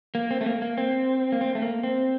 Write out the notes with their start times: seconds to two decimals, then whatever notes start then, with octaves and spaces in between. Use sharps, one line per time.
0.15 A#3
0.31 C4
0.41 A3
0.46 A#3
0.62 A#3
0.78 C4
1.32 A#3
1.41 C4
1.55 A3
1.62 A#3
1.83 C4